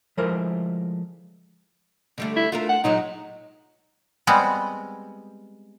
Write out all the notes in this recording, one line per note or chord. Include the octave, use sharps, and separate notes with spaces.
F3 G#3 A3 E4 A#4 C5
D3 G3 A3
E4
A3 D4 F4 A#4
F#5
A#2 F#3 G#3 D#4
G3 G#3 B3 C4